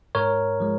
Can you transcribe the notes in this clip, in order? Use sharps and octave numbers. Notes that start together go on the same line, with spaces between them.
G#2 A#4 C#5
F3 G#3